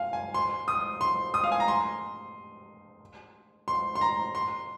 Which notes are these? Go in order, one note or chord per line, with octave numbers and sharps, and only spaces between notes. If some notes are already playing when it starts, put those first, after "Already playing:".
Already playing: F5 G#5
G#5
C6
D#6
C6
D#6
F5
G#5
A#5
C6
C6
C6
A#5
C6